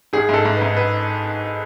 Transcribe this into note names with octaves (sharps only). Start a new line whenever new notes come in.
G#1 G#4
G#2 A4
G#2
B4
G#2
B4